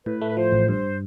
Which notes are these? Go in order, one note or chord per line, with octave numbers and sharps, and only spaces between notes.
A2 B4
A3
B4
F3 C5
A1
G2 C5